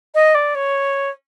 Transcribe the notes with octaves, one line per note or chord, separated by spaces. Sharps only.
D#5
D5
C#5